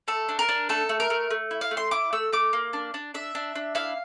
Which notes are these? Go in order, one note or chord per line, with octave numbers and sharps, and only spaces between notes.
A3 A4
D4
A#4
D4
A3 A4
A3
A#4
A3
A3
E4
F5
A3
C6
E4 D6
A3 E6
A3 D6
A#3
D4
D4
D4 E5
D4
D4
E4 F5